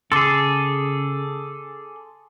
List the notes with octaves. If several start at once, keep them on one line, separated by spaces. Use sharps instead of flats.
C#3 G#4 A4 C6 D6